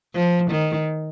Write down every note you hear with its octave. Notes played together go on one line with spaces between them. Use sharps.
F3
D#3